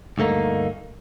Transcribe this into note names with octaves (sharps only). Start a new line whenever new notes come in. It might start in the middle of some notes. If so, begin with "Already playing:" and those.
D2 G2 A3 A#3 D#4